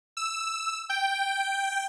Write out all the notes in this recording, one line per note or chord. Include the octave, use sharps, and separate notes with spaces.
E6
G5